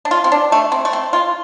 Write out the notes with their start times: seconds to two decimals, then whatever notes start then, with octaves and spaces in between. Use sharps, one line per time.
0.05 D4
0.11 F4
0.24 C4
0.32 D4
0.52 A3
0.72 C4
0.85 A3
0.93 C4
1.13 F4